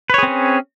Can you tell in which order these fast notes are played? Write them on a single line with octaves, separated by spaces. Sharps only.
B4 C#5 G#4 C4 C#4